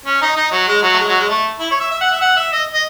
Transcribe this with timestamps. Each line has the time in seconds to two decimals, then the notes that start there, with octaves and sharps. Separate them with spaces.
0.06 C#4
0.22 D#4
0.36 D#4
0.51 F#3
0.68 G#3
0.82 F#3
0.93 A3
0.99 G#3
1.08 F#3
1.18 G#3
1.29 A3
1.60 E4
1.71 C#5
1.80 E5
1.91 E5
2.01 F#5
2.12 E5
2.21 F#5
2.37 E5
2.52 D#5
2.73 D#5